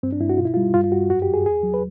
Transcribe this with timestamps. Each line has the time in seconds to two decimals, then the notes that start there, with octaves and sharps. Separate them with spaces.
0.03 G2 C4
0.12 D4
0.21 G2 E4
0.29 F#4
0.38 B2 F4
0.45 E4
0.54 G3 F4
0.74 G2 F4
0.84 F4
0.92 G2 F#4
1.10 F#2 F#4
1.22 G4
1.28 F#2
1.34 G#4
1.46 E2 G#4
1.63 F#3
1.74 B4